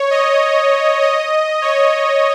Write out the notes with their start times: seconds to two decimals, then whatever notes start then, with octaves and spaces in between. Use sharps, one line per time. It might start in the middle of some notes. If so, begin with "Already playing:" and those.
Already playing: C#5
0.11 D#5
1.01 D#5
1.62 C#5